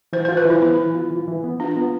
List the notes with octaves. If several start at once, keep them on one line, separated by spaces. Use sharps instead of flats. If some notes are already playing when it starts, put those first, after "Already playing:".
E3 C5
F4 C5
B4
E3 E4
B3 E4
E3
F4
E3
E3
B3
D4 F4
B3